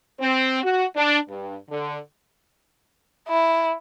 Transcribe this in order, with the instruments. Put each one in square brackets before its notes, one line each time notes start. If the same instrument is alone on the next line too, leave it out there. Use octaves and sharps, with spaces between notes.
[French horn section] C4
F#4
D4
G2
D3
[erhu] E4